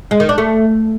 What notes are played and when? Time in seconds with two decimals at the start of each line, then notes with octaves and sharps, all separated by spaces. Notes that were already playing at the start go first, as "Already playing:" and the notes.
0.11 G#3
0.20 D#3
0.29 D4
0.38 A3